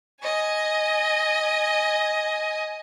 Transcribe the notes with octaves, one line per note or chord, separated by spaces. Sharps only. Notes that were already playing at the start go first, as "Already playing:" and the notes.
D#5 G#5